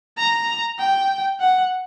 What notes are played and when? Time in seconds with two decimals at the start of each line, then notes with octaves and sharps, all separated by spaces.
0.18 A#5
0.79 G5
1.40 F#5